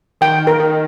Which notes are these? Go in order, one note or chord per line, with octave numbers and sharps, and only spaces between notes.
D#3 G5
A#4
D#3